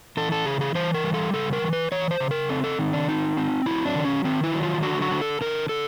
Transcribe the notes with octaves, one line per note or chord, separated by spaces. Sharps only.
E3 A4
A4
C#3 G#4
G#4
E3 C5
A#4
G3
A4
C#3 A4
A#4
E3
B4
E3 C#5
C5
C#3
A#4
C4 A4
A4
D#3 D#4
D4
C4 D#4
C4
F#3 E4
D4
D#3
C#4
D#3 C4
E4
F#3
F4
D3 F#4
F#4
D3
A4
D3 A#4
D3 A4